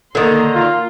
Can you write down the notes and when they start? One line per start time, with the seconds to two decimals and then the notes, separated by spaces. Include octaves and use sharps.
0.15 D3 D#3 A#3 A#5 C6
0.55 F4